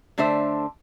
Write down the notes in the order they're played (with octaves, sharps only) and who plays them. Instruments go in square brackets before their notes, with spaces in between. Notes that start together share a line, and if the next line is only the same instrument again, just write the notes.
[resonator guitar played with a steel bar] D3 A3 D4 C5 E5